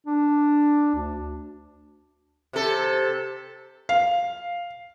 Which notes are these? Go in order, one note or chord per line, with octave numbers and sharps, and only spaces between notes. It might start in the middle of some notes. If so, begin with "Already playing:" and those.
D4
D2
C3 A4
F5